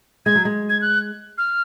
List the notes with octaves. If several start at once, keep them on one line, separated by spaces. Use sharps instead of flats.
G#3 G#6
F#3
G#3
G#6
F#6
F6